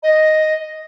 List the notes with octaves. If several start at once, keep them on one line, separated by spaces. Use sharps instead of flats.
D#5